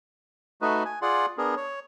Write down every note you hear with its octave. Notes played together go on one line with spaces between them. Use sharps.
A3 D#4 F#4 B4
G#5
F4 G#4 D5 F#5 C6
B3 D4 G#4 A#4
C#5